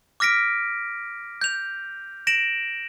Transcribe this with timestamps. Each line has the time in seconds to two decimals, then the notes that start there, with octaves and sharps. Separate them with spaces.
0.20 D6 F6 A#6 B6 D7
1.41 G6 F7
2.27 A#6 D7 E7 F#7